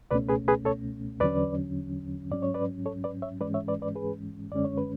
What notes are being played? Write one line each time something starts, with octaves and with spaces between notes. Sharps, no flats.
C#2 B2 A3 C#4 B4 D5
G#4 B4
G#4 B4
A4 C#5
E2 D3 F#3 C#4 B4 D5
G#2 F#3 C#4 D5
C#5
B4 D5
A4 C#5
B4 D5
C#5 E5
G#2 E3 G#3 C#4 B4 D5
C#5 E5
B4 D5
B4 D5
G#4 B4
F#2 D3 G#3 C#4 D5
C#5
B4